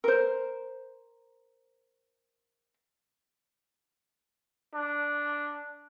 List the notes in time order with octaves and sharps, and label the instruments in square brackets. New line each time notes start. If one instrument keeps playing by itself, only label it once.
[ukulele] A#4 C5
[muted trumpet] D4